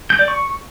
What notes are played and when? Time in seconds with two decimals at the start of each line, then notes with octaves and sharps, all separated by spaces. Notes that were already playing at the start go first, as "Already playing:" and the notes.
0.10 G6
0.19 D5
0.28 C#6